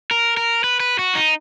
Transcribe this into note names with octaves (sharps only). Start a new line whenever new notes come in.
A#4
A#4
B4
B4
F#4
D#4